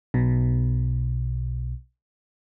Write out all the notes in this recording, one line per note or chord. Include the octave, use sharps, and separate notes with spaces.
B1 B2